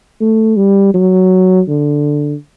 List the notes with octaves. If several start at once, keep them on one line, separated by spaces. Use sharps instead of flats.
A3
G3
F#3
D3